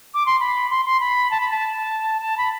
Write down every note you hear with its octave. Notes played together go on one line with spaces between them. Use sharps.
D6
C6
B5
C6
C6
B5
A5
B5
A5
A5
B5